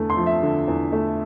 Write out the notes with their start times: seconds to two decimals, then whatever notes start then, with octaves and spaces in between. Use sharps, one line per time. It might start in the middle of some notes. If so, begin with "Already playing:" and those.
Already playing: E2 D3 A3
0.10 C6
0.17 F3
0.26 E5
0.43 D3
0.68 E2
0.92 A3